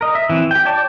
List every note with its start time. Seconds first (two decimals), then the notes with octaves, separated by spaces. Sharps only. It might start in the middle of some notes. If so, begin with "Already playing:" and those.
0.01 A#4 D#5
0.15 E5
0.30 E3 C4
0.51 G4 G5
0.65 C#5 D5 G5 A5 D6